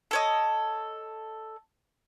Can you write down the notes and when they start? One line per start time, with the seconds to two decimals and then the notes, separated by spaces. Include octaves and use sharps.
0.11 A4 C#5 D#5